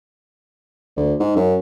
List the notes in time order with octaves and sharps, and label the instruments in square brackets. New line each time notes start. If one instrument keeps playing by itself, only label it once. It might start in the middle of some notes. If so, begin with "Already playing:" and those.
[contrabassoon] D2
G#2
F#2